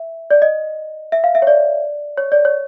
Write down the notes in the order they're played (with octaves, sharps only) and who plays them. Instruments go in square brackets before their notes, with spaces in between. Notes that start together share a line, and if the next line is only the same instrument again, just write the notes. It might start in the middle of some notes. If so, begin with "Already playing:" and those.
Already playing: [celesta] E5
D5
D#5
E5
F5
E5
C#5
D5
C#5
D5
C#5